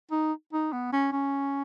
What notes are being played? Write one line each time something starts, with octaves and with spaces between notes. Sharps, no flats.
D#4
D#4
B3
C#4
C#4